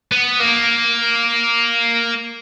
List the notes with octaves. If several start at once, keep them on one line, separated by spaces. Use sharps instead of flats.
B3
A#3